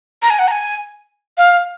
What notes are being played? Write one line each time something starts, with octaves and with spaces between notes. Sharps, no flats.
A#5
G#5
F#5
A#5
G#5
F5